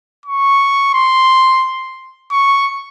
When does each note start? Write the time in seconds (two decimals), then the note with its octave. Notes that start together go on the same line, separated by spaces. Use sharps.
0.26 C#6
0.94 C6
2.32 C#6